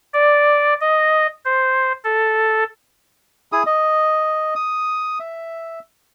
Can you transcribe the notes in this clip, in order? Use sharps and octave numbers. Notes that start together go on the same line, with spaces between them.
D5
D#5
C5
A4
E4 G#4 D#6
D#5
D#6
E5